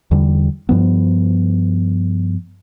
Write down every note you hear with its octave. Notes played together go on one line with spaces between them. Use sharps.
E2 D3 G3
G2 F3 B3